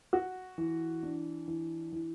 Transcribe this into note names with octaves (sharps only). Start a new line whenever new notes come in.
F#4
E3
D4
E3
E3